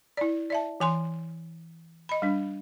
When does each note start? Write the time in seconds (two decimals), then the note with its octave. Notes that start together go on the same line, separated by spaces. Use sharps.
0.17 E4 D5
0.50 D5 E5 A5
0.80 E3 G#5 C6
2.09 D#5 B5
2.22 G3 D4